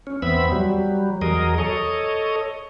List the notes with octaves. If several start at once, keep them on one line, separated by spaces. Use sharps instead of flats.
C#4
E2 B3 C4 E5 B5
F#3 G3
E2 F#3 G#4 A#4 D#5
A4 C#5 D#5